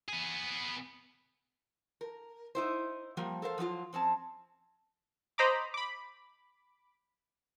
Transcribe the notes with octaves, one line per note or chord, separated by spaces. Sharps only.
B3 G#4
A#4
D#4 E4 C5
F3 G3 A#3
A4 A#4 C5 F5
F3 F#3 D#4 F4
F3 C4 C#4 A5
C5 D#5 A#5 B5 D6
B5 D6